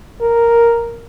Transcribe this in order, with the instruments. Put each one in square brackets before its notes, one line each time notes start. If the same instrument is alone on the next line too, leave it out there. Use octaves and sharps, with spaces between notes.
[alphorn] A#4